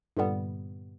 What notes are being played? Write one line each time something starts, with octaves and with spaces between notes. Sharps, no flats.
G2 A#2 D3 G3 B3